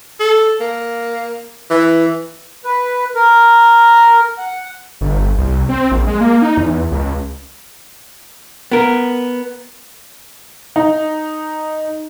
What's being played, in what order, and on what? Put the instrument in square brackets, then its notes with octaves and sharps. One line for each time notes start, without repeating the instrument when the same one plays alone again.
[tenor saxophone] A4
A#3
E3
[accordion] B4
A#4
F#5
[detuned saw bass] G1
C2
C4
A#1
G#3
A#3
D#4
E2
C#2
[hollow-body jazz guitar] B3 A#4
[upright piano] D#4